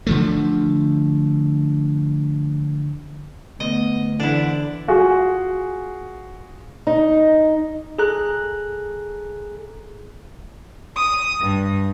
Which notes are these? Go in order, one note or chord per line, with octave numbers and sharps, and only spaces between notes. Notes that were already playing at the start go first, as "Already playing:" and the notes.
D3 F3 A3
D3 A3 B3 D#5
D3 E3 D4 E4 C5 F#5
F4 F#4 G#4
D#4
G#4 A4 A#5 F#6
D#6
G2